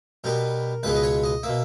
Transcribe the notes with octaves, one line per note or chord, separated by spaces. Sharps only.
B2 G3 B3 A#4
C#2 B2 G#3 B3 B4
D#5
C#5
D#5
B2 A#3 E5